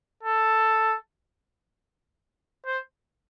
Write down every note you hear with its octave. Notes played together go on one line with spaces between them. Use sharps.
A4
C5